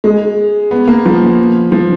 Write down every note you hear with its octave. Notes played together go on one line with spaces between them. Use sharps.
G#3
B3
A#3
F3
F3